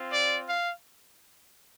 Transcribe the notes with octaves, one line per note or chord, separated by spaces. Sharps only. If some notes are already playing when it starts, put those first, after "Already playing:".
Already playing: C4 F4
D5
F5